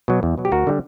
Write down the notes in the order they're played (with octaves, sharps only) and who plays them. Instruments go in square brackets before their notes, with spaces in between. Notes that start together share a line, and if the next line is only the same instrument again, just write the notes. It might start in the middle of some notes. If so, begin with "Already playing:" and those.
[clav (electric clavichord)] B2 F#3
E2
B2 F#3
G4
D2 F#4 A#4
D3 G3